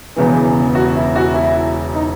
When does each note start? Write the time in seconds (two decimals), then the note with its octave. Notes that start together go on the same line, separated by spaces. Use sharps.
0.16 E1 E2 C#3 E3
0.75 F#4
0.96 E4
1.16 F#4
1.35 E4
1.95 D#4